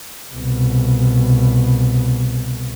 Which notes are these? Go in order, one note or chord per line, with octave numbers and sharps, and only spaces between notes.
C2 B2